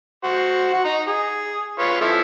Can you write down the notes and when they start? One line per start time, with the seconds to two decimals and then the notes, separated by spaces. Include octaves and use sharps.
0.24 F#4 C5
0.73 F#4
0.85 D#4 A#5
1.08 G#4
1.79 F4 B4 C#5
2.01 F3 E4 A4